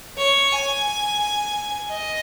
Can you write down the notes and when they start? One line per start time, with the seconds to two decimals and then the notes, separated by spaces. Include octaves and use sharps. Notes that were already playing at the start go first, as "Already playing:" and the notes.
0.18 C#5
0.52 G#5
1.90 D#5